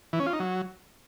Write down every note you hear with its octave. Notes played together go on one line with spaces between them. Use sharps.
E3
C#4
F4
D#4
F#3